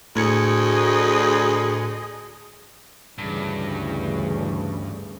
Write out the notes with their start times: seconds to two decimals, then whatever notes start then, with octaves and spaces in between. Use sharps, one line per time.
0.16 D2 A2 G#4 D#5 G#6 C#7
3.18 D2 G2 C#3 E3